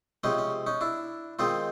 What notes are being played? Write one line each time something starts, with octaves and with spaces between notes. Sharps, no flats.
C3 F3 G#3 C#4 D#4
C#4
C#4 D#4
D4 E4
D#3 G#3 C4 D#4 F4